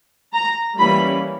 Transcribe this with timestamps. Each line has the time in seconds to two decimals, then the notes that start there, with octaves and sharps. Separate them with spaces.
0.34 A#5
0.78 E3 G3 A#3 C#4 B5